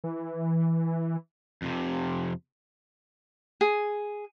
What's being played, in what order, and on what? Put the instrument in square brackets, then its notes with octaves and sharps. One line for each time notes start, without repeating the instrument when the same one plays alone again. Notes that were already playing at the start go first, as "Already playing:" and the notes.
[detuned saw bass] E3
[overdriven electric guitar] F2 C3
[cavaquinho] G#4